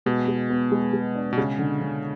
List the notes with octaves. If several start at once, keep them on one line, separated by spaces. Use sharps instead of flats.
B2 G#3
G#3
B3
G#3
G#3
D4
B2
C#3 G#3
D3
D3